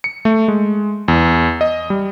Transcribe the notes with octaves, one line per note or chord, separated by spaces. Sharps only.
C#7
A3
G#3
E2
D#5
G3